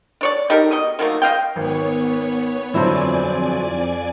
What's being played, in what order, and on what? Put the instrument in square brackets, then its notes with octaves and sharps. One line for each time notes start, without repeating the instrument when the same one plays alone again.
[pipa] D4 C#5 D5
D#4 G4 A4 A#4
B2 D#5
D#3 F#3 A3 A#3
C5 D#5 F5 G5
[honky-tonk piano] G#1 [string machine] B3 C#5
[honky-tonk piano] G1 C5 [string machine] F2 D5 G#5 [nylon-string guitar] F#3 D4 E4